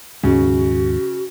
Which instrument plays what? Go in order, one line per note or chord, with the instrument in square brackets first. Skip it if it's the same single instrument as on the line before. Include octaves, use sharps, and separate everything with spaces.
[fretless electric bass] D#2 G#2 G#3 [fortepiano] C#3 [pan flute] F#4